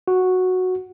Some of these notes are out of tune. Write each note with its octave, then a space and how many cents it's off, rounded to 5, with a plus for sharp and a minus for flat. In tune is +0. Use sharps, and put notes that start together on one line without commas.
F#4 -5